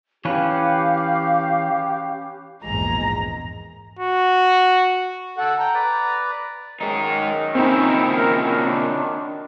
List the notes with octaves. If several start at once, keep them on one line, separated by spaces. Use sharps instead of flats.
E3 C#4 G4 B4 C#5 F5
A#1 E2 G#2 G#3 A#5
F#4
A4 F#5
G5 A#5
B4 D5
F#2 D#3 G#3 D#4
A#2 C#3 C4 C#4 D#4 E4
A#4
D4